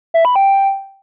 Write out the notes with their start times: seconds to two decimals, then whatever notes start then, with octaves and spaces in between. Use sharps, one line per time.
0.14 E5
0.25 B5
0.36 G5